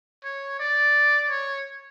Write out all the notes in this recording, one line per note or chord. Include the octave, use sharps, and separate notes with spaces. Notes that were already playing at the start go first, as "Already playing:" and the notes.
C#5
D5
C#5